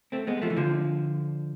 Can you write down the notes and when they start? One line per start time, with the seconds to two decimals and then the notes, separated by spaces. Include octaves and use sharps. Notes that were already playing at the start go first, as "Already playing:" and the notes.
0.12 A3 C4
0.27 G#3 B3
0.37 G#3
0.42 F3 A3
0.50 E3
0.57 D3 F3